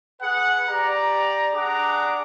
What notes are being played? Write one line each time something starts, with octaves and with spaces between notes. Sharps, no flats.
G#4 B4 F#5
G4 D5 A#5
D4 G#4 F#5 A#5 D6